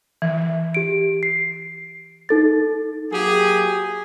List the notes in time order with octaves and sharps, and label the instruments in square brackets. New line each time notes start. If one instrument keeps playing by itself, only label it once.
[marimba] E3
[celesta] G4 D7
C7
D#4 A4 A6
[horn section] F#3 A#3 G4 G#4